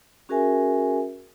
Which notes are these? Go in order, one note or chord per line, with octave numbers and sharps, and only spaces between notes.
C#4 F#4 G#4 A#4 E5 G#5